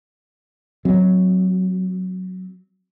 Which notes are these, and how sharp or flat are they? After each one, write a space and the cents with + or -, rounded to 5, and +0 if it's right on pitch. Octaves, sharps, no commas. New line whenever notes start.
F#3 +0 C4 -5